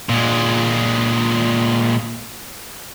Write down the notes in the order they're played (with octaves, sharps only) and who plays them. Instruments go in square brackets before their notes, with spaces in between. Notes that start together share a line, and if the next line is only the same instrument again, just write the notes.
[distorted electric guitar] A#2 G#3